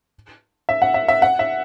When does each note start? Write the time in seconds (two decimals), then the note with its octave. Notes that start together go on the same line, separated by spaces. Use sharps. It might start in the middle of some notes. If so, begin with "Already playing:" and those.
0.69 E5
0.82 F#5
0.94 E5
1.08 E5
1.22 F#5
1.39 E5